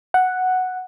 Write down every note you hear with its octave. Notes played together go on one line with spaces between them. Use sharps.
F#5